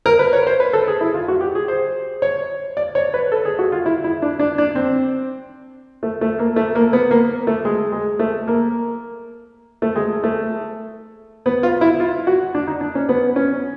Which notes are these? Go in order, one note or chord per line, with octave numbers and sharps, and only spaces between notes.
A#4
B4
C#5
C5
B4
A4
G#4
E4
F4
F#4
G4
G#4
C5
C#5
D5
C#5
B4
A4
G#4
F#4
F4
E4
E4
D4
D4
D4
C4
A3
A3
A#3
A3
A#3
B3
A#3
A3
G#3
G#3
A3
A#3
A3
G#3
A3
B3
F4
E4
F4
F#4
D4
D#4
D4
C#4
B3
C#4